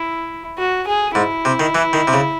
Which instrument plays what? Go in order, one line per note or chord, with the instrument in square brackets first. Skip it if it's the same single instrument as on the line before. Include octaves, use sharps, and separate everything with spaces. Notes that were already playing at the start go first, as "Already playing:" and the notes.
Already playing: [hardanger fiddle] E4
F#4
G#4
[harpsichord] G#2 [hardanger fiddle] E4
[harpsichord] C3
D#3
E3
D#3
C3
C#3